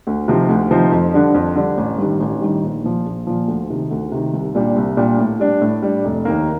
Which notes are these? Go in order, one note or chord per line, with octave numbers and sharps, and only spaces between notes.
D2
C3 F3 C4 D#4
D2
C3 F3 C4 D#4
F2
D3 G3 D4
F2
D3 G3 D4
A1
G2 D#3 G3
A1
G2 D#3 G3
A#1
A#2 F3
A#1
A#2 F3
D2
C3 D#3
D2
C3 D#3
C2
A#2 G3 D4 G4
C2
A#2 G3 D4 G4
A2
G3 D4
A2
G3 D4
F1
D#2 D#3 A#3